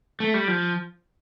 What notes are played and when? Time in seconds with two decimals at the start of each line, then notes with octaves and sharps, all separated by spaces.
0.20 A3
0.34 G3
0.48 F3